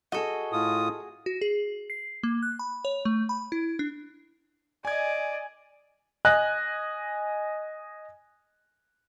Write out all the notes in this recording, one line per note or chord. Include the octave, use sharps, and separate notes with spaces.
F#4 G#4 A4 D#5
A2 F4 D#6
F#4
G#4
C7
A#3
F#6
B5
C#5
A3
B5
E4
D4
D5 D#5 G#5 G#6
D#5 G#5 F#6